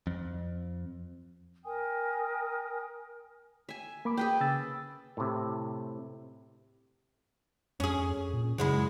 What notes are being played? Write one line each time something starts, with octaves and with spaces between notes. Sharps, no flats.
F2
A#4 G5 G#5 D#6
E5 G#5
A#3 B5 D6
G#4 B4 G5
C#3 E6 A6
A2 C3
F2 C#4 G#4
A#2
F#2 C#3 G#3 E4